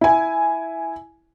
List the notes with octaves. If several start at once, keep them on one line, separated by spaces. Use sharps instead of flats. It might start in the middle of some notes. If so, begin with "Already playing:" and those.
E4 G#5